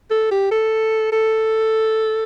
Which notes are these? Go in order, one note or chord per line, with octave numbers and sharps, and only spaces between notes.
A4
G4
A4
A4